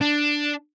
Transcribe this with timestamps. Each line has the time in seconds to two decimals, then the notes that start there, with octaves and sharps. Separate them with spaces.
0.01 D4